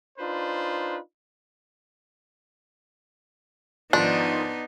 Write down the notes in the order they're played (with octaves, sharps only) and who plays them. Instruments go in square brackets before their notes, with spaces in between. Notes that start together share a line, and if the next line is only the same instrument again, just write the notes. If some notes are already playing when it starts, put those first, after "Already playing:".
[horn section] D4 D#4 F4 B4 C5
[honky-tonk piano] G#2 D#3 F3 [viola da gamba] B3 D#4 [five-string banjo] D4